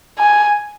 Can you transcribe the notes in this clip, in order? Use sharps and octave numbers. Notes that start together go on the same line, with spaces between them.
G#5